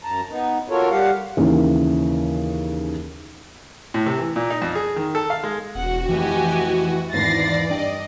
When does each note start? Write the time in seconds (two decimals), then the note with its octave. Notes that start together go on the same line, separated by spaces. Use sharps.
0.04 F#2 A5 A#5
0.30 B3 D#4
0.70 F4 F#4 A4 A#4 C#5
0.90 G3 G4 F5 F#5
1.37 D#2 C#3 E3
3.94 A2
4.06 C3
4.19 E3
4.36 A#2
4.50 D#4
4.62 F2
4.75 G#4
4.96 D#3
5.15 A4
5.30 F5
5.43 G#3
5.75 E1 F#4 F#5
6.09 F1 E3 G4 D#5 G#5
7.13 G#1 E2 G#2 D5 A6 A#6 C7
7.70 G2 D#5 G5